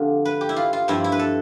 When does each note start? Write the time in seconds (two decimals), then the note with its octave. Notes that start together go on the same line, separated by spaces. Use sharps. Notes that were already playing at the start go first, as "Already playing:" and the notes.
Already playing: F2 D3 A3 C4 F4 G4
0.25 B4
0.41 G4
0.49 E4
0.56 F4
0.73 F4
0.88 G2 F3 C4 E4
1.04 E4
1.12 B4
1.19 A4